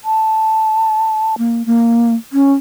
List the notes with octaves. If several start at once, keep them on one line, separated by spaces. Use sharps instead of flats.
A5
A#3
A#3
C#4